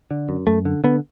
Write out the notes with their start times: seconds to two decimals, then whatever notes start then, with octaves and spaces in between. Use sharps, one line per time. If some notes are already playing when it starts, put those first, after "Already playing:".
0.11 D3
0.29 F#2
0.47 F#2 A3
0.65 D3
0.84 D3 B3